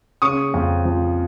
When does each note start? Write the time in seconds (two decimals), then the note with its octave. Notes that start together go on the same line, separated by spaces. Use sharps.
0.22 C#3 C#6 D#6
0.54 F2
0.85 F3